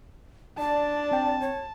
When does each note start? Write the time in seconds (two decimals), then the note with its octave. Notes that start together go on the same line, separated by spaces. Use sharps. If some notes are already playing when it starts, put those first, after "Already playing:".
0.59 D4 D5 A5
1.11 C4 G5
1.41 C#5